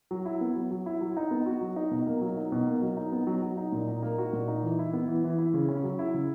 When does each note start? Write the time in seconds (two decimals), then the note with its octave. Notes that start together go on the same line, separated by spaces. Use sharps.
0.11 F#3
0.25 E4
0.41 B3
0.56 F#3
0.71 F#3
0.86 E4
1.01 F#3
1.17 D#4
1.31 B3
1.46 F#4
1.61 F#3
1.76 D#4
1.91 B2
2.07 A#3
2.21 F#3
2.37 D#4
2.52 B2
2.67 A#3
2.82 F#3
2.97 D#4
3.12 B3
3.27 F#3
3.42 F#3
3.57 D#4
3.72 A#2
3.88 D#4
4.03 A#3
4.18 F#4
4.33 A#2
4.48 D#4
4.63 E3
4.79 E4
4.93 B3
5.08 E3
5.24 E3
5.38 E4
5.54 C#3
5.69 C#4
5.84 F#3
5.99 E4
6.14 C#3